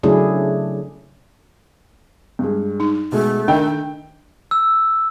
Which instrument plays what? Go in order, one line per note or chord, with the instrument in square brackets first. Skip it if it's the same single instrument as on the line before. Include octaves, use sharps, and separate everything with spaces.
[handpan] C#3 F#3 A3 D4 E4 G#4
[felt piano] G2 G#3
[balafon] D#4
[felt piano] B2 G#3 [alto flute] A3
[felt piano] D#3 [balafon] D4 A#4 D#5 [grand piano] G5
[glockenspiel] E6